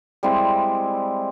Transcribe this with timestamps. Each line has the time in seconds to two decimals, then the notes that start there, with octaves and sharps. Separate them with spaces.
0.23 G3 G#3 C4 E4